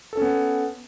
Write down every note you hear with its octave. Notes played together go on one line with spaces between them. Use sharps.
B3 C#4 A4